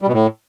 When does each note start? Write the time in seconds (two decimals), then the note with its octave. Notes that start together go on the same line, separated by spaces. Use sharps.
0.02 G3
0.07 B2
0.13 A2